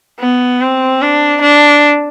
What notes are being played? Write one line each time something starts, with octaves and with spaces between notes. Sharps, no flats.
B3
C4
D4
D4